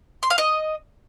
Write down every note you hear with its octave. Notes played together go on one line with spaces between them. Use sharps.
C6
F5
D#5